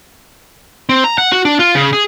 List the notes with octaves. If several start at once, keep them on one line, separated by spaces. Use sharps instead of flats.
C4
A#5
F#5
F#4
D4
F4
C#3
G#4